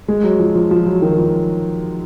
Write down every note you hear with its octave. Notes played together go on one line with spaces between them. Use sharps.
G#3
F#3
F3
F3
F3
F#3
D#3
F3